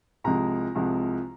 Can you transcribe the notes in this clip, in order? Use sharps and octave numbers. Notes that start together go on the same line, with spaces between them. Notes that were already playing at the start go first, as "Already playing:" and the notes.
C2 C3 F3 G#3 A#5
C2 C3 F3 G#3